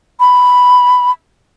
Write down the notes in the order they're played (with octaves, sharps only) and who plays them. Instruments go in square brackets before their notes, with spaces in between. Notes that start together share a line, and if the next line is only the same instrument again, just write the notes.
[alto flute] B5